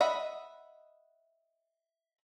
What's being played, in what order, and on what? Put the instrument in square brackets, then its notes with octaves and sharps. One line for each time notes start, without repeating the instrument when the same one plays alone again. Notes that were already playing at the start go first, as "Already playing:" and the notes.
[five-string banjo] D#5 E5 F#5 B5